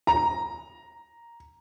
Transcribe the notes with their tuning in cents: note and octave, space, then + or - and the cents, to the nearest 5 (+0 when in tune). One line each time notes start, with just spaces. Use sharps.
A#5 +0